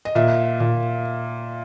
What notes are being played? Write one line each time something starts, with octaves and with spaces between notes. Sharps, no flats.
D#5
A#2 E5
A#2